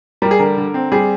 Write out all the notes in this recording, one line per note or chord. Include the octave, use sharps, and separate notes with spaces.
G3 A#4
G#4
D3 A#4
D3
C4
G3 G#4